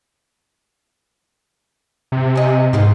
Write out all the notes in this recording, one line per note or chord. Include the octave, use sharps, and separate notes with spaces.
C3
D#5 G#5
G#2 B2 D#3 F4